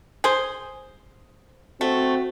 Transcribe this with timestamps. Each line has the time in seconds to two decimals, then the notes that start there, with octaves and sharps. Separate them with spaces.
0.24 G#4 C5
1.81 A3 C4 F#4